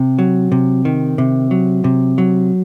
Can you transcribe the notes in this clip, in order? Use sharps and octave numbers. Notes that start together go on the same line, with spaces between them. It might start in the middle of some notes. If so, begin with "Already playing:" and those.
Already playing: C3
F#3
C3
D#3
C3
F#3
C3
F#3